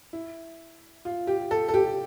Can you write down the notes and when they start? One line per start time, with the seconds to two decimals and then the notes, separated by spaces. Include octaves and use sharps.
0.13 E4
1.05 F4
1.27 G4
1.51 A4
1.69 A4
1.74 G4